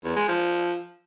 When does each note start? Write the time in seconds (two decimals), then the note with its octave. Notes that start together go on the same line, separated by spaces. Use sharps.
0.04 E2
0.16 G#3
0.28 F3